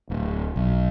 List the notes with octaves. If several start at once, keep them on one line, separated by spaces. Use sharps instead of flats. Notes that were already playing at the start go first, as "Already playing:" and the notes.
D1
B1